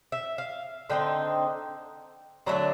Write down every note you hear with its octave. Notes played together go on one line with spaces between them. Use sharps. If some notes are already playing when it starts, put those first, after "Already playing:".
E5
F5
D3 G3 C4 D#4 G5
D3 F#3 A3 D4 A#5